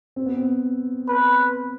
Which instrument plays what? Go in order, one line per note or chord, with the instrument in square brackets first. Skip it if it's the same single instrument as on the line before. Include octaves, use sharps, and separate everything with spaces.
[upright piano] C4
B3
C4
[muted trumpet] B4